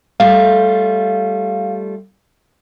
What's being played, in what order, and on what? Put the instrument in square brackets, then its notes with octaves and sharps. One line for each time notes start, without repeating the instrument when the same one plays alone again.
[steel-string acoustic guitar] G3 A3 F4 [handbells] F5